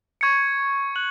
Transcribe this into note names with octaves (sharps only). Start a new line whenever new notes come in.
C#6 G#6 C#7
F#6 F#7